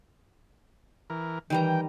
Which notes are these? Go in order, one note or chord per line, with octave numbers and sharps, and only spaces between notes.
E3 A#4
D#3 E3 G3 G5 A#5